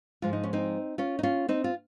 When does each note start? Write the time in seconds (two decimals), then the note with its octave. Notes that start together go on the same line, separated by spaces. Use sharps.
0.22 G#2 F3 G#3 F4
0.33 D#4
0.43 C#4
0.53 C4 D#4
0.98 C#4 F4
1.19 D#4
1.23 C#4 F4
1.49 C4 D#4
1.64 F4